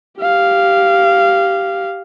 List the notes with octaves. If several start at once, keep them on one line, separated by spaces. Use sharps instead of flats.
G4 F5